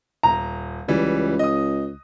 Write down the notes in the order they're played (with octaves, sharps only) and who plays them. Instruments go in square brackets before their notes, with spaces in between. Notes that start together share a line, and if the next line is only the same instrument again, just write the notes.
[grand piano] D#1 [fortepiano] A#5
[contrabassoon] C#2 [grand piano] E3 G3
[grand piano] D#5 D#6